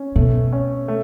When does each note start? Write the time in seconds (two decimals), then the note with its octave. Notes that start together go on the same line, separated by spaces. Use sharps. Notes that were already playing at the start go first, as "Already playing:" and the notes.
Already playing: C#4
0.16 B2 A3
0.52 C#4
0.88 A3